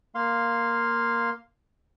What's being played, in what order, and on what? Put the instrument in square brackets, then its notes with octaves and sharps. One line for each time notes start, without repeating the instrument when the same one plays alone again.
[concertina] A#3 F5 C6